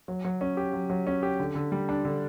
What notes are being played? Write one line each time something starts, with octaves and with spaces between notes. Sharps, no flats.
F#3
F#3
C#4
G4
F#3
F#3
C#4
G4
D3
D3
G3
D4
D3